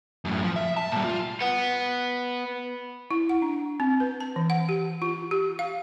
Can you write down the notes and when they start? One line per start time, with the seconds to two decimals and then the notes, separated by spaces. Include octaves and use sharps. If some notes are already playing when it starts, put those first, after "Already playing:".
0.25 F#2 A2
0.44 F3
0.56 E5
0.77 A5
0.92 A#2 G3
1.04 F4
1.41 B3
3.11 E4
3.29 F#5
3.42 D4
3.80 C4
4.00 B4
4.20 A5
4.36 E3
4.50 F#5
4.69 G4
5.02 F4
5.31 G4
5.59 F5